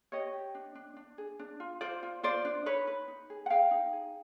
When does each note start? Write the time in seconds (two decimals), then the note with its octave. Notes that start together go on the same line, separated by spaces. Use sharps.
0.12 G4 C#5 D#5
0.33 G4
0.55 D4
0.75 D4
0.97 D4
1.18 G#4
1.39 D4
1.60 F4
1.81 F4 C5 D5
2.03 F4
2.23 F4 C5 D5
2.45 D4
2.66 D#4 B4 C#5
2.87 B4
3.08 D#4
3.30 G#4
3.46 F#5
3.50 G#4 F5 G5
3.71 D#4
3.93 G#4